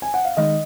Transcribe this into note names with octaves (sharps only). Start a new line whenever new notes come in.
G#5
F#5
F5
D#3 G#3 D#5